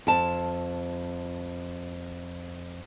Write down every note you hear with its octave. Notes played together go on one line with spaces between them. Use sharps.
F2 A5